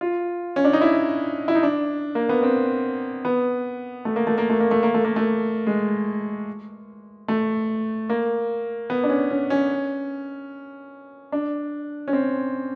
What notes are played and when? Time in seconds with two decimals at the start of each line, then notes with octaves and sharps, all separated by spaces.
0.01 F4
0.56 C#4
0.65 D4
0.73 D#4
0.81 E4
1.48 E4
1.55 D#4
1.63 D4
2.15 A#3
2.29 B3
2.43 C4
3.25 B3
4.05 A3
4.16 A#3
4.27 A3
4.38 A#3
4.50 A3
4.60 A#3
4.71 A3
4.83 A#3
4.94 A3
5.05 A#3
5.16 A3
5.67 G#3
7.28 A3
8.09 A#3
8.90 B3
9.03 D4
9.09 C#4
9.30 C#4
9.50 C#4
11.32 D4
12.08 C#4
12.13 C4